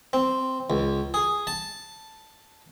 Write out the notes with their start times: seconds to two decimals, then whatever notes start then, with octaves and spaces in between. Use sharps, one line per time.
0.13 C4
0.70 C#2
1.14 G#4
1.47 A5